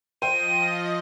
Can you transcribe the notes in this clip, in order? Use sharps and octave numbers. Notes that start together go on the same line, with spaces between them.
F3 C5 D#5 G5 D#7